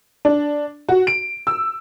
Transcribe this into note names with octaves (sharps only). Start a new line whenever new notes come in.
D4
F#4
D7
E6